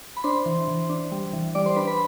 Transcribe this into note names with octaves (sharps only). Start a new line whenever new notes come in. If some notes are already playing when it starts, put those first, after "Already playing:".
B5
D4 C5 C6
E3
E3
D4
G3
E3
G3 D5 D6
C5 C6
D4 B4 B5
B4 B5